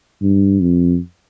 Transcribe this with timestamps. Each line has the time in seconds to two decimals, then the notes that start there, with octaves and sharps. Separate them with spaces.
0.22 G2
0.62 F2